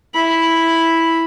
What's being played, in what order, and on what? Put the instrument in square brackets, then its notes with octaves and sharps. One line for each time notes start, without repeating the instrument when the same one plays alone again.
[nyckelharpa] E4 B5